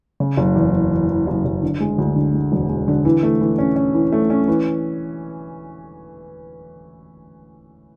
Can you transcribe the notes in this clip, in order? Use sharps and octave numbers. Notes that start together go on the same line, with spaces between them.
C#3
F#1
E2
E2
E3
E3
F#1
F#1
D3
G#3
D2
D3
G#3
E1
G#3
D3
E3
A3
E3
C#4
C#4
E3
A3
C#4
E3